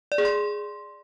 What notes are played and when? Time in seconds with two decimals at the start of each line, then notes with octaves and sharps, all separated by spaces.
0.12 D5
0.18 G#4
0.25 C6